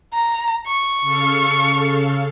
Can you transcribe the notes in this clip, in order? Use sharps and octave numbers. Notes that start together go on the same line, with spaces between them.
A#5
C#6
C#3 A4 F5